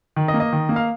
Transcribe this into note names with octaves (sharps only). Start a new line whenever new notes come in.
D#3
D#5
A#3
D#5
D#3
A#3
F5